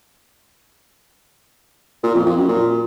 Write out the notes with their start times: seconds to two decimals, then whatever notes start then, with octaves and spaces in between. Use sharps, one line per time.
2.03 A#2
2.15 F2
2.26 F2
2.37 F#2
2.48 A#2